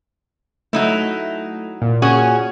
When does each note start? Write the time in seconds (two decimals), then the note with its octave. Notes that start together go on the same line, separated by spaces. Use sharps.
0.73 F#3 A3 D#4 E4
1.82 A#2
2.02 C#4 F#4 G#4